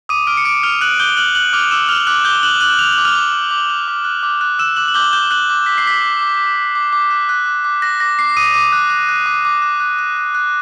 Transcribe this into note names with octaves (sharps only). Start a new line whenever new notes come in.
D6 D#6 D#7
D6 F6 D7
C#7
D6 D7
F6 F7
F6 F#6 F#7
D6 G6 G7
F6 F#6 F#7
F6 F#6 F#7
D6 F6 F7
D6 E6 E7
F6 F7
D6 F#6 F#7
D6 G6 G7
F#6 F#7
D6 F#6 F#7
D6 F7
D6 F#7
F6 F7
D6
F#6
D6
F#6
D6
F#6
D6
F#6
E6 F#6 E7
D6 F#6 F#7
F#7
D6 G6 G7
F#6 G6 G7
D6 F#6 F#7
D6
D6 B6
C7
D6 B6
D6
D6
D6
D6
D6
D6
F#6
F#6
D6
D6
F#6 A#6
D6 A#6
D6 C7
D6 D#6 D#7
D6 D#6 D#7
F#6
F#6
F#6
D6
D6
F#6
F#6
F#6
F#6
F#6